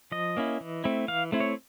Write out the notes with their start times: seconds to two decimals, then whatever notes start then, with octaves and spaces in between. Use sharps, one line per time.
0.12 F3 D#5
0.37 A#3 C#4 E4
0.61 E3
0.84 A3 C4 E4
1.08 E3 F5
1.32 A3 C4 E4
1.40 C#5